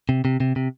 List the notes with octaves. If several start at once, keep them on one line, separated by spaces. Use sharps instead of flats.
C3
C3
C3
C3